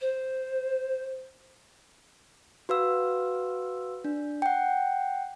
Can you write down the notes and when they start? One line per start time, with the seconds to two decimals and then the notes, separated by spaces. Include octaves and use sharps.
0.01 C5
2.69 F#4 B4 F5 E6
4.04 D4
4.42 F#5 G5